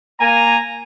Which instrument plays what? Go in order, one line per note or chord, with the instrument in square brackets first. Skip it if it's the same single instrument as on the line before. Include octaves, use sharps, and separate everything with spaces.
[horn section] A#3 G#5 [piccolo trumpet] A#5